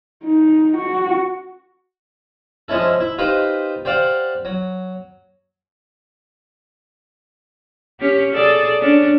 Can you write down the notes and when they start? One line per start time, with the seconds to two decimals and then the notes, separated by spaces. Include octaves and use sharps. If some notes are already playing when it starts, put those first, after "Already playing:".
0.24 D#4
0.77 F#4
2.68 F3 G#3 C#4 E4 A4
3.00 E4
3.18 D#4 F4 G4 B4 C5
3.85 G4 C5 D5 F5 F#5
4.45 F#3
8.00 C#4 G4
8.33 G#4 A4 D5
8.81 C#4 D4